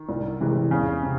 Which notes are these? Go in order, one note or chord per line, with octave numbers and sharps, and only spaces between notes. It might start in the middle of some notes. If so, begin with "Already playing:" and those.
Already playing: D#3
C2
C3 E3 G#3
E2 C#3
C3